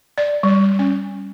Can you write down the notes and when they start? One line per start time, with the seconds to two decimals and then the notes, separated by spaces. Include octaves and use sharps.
0.18 D5
0.43 G3
0.79 C#4